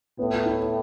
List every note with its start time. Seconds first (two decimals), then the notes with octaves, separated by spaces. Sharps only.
0.19 A2 B3
0.46 E4